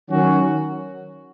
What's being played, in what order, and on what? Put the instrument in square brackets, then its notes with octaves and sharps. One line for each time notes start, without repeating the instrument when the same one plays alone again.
[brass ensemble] D#3 F#3 C#4 F#4